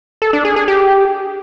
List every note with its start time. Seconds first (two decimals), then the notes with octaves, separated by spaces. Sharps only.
0.22 A4
0.33 D4
0.45 G#4
0.56 G#4
0.68 G4